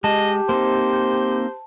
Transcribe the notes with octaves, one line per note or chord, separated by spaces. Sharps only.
G#3 G4 D#5 A5
A#3 C4 D#4 C5